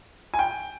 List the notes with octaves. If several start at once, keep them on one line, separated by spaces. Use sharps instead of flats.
G#5
G5